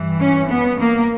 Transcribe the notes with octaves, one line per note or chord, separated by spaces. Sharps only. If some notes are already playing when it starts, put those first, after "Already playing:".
Already playing: G2 E3
C#4
B3
A#3